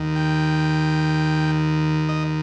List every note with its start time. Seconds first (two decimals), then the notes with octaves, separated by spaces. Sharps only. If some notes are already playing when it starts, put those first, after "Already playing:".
Already playing: D#2 D#3
0.16 G5
2.09 D#5